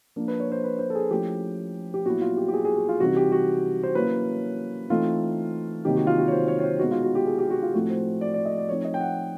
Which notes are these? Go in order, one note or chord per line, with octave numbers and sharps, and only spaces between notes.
F3 A#3 D4
B4
C#5
C5
B4
C5
A4
G#4
F3 A3 C#4 E4 G4
G4
A#2 F#3 B3 E4 F#4
F4
G4
G4
G#4
G#4
F#4
F4
C3 E3 G3 C4 D#4 F#4
G4
F#4
C5
F#3 A#3 C#4 E4 B4
E3 A3 C4 D#4 F4
C3 D#3 F#3 A#3 D#4 G4
F#4
F4
F#4
C#5
C5
C#5
C#5
C5
B2 G#3 B3 D#4 F#4
F4
F#4
G4
G#4
G4
F#4
F4
A2 F3 A3 C4 E4 F#4
C5
D5
D5
D#5
D5
F3 A3 C4 D#4 C#5
D#5
G5
F#5